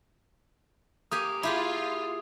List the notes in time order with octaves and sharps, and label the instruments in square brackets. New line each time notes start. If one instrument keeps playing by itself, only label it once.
[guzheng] A#3 G4 G#5 [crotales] D#6
[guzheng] E4 G4 G#4 [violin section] F4